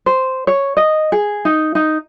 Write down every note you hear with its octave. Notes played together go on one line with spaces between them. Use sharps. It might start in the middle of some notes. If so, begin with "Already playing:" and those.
C5
C#5
D#5
G#4
D#4
D#4